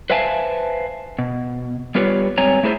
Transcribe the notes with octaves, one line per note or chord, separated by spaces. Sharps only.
B4 C5 E5 F5 G#5 A5
B2
G3 B3 F4 G4 B4 C#5
G#2 G3 C4 C#5 G#5 A#5
A3 E4 G#4 B4 C5 E5